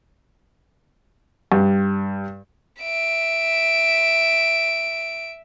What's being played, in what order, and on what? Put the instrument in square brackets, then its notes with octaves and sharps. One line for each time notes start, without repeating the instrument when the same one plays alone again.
[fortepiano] G2
[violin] E5 D7